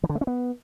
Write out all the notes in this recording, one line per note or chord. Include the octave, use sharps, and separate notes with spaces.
E3
D3
A3
C#4
B3